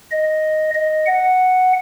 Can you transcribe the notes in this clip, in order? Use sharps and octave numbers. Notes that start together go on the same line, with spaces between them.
D#5
D#5
F#5